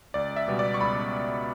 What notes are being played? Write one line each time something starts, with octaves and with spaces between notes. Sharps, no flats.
C#2 D5
E5
B2 G3 B3
D5
C#6
C#2 B5